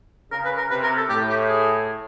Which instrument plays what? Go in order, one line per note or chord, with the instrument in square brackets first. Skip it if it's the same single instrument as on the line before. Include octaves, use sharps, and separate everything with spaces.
[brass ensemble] C#3 [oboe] A#4
[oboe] B4
A#4
[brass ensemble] C3 [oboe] B4
[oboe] A#4
A4
[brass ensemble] A2 [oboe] G4
[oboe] G4
G#4